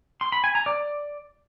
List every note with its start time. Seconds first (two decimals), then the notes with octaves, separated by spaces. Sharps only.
0.21 C6
0.32 B5
0.44 G#5
0.55 A#5
0.66 D5